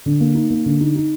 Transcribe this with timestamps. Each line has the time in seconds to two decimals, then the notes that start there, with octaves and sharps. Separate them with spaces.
0.06 D3
0.20 A#3
0.35 D#4
0.50 A#3
0.66 D3
0.81 D#4
0.95 D#4